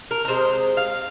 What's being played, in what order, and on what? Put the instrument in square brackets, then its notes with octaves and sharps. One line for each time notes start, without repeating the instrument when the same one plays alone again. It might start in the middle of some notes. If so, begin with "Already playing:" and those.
[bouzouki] A#4
A#4
C3 G#3 C5
F5